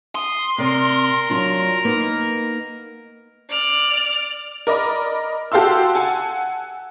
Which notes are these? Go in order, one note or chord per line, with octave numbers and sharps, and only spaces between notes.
C6 D#6
C3 A#4 D5
F#3 D4 F4
A#3 B3 D#4
D5 F6
A#4 D5 D#5 B5
F#4 G4 A4 F5 C6 E6
F#5 G#5 A5